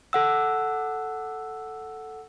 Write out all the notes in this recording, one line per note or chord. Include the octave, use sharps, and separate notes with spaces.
A4 F#5 E6